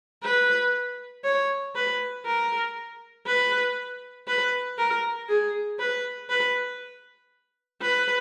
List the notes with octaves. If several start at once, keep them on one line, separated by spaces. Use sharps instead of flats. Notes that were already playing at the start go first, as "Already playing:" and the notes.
B4
C#5
B4
A#4
B4
B4
A#4
G#4
B4
B4
B4